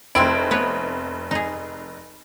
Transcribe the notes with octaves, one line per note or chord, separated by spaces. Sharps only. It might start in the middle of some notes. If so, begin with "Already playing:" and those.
F1 G#3 C4 E4 D7
B3 B4 C#5
D#4 G#4